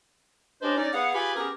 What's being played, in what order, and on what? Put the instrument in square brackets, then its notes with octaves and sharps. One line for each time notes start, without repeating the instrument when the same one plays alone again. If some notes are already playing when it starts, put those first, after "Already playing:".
[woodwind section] C#4 D4 G4 B4 C5 D#5
C#4 D#4 D5
B3 G#4 F5 F#5
F4 G4 G#4 B4 G#5 B5
B3 C#4 G4 G#4 A#4